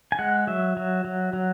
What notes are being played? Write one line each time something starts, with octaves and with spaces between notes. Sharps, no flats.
G#5
G#3 F#5
F#3 E5
F#3
F#3
F#3